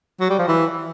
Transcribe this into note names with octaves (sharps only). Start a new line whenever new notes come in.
F#3
G3
F3
E3